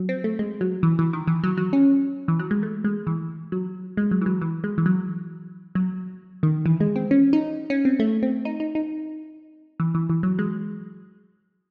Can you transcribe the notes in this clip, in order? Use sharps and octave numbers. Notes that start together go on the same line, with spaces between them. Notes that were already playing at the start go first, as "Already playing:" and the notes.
Already playing: F#3
C4
A3
G#3
F#3
E3
E3
D#3
E3
F#3
F#3
C#4
E3
F#3
G#3
A3
G#3
E3
F#3
G#3
F#3
E3
F#3
E3
G#3
E3
F#3
F#3
D#3
E3
G#3
C4
C#4
D#4
C#4
C4
A3
C4
D#4
D#4
D#4
E3
E3
E3
F#3
G#3